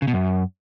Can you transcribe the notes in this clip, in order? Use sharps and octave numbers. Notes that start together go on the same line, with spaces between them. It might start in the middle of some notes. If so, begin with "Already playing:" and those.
C#3
B2
F#2